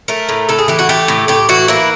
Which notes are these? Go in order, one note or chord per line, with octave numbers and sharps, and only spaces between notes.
A3 A#4
A2
A2 A4
G#4
E3 G4
F#4
A3 G4
A2
A2 G4
E3 F#4
A#3 E4